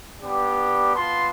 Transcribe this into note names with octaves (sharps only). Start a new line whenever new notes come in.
G3 B3 D4 G4
B3 F4 A5 C6